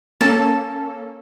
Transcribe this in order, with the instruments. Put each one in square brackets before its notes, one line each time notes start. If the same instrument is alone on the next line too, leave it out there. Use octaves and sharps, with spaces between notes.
[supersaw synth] A#3 C#4 A4 [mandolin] A5